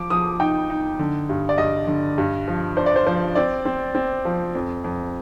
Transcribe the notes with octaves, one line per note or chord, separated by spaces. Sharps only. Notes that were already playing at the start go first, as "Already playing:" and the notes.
Already playing: F3 D6
F3 D#6
D#4 G5
D#4
D3
G2
D5
G2 D#5
D3
G2
F3
D4 C5
D5
C5
F3 C5
C4 D5
C4
C4
F3
F2
F2